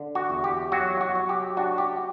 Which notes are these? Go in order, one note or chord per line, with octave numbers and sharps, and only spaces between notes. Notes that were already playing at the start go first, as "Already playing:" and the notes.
Already playing: D3
F#4
E2
G4
F#3 F#4
F#4
F#3
G4
D4 F#4
G4